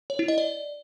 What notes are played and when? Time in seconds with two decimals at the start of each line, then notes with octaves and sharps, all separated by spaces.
0.10 C#5
0.19 E4
0.28 D#5
0.38 D5